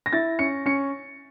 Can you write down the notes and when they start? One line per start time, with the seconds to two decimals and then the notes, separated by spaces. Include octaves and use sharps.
0.06 A#6
0.13 E4 A6
0.39 C#4 C#7
0.66 C#4 C#7